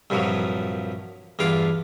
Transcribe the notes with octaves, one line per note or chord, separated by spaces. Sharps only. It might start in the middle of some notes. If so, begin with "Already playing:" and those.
C2 G2 A#2 F3 F#3
E2 G2 F4 F5 D6